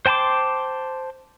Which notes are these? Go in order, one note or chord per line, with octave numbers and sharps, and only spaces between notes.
C5 G5 A5 C6 D6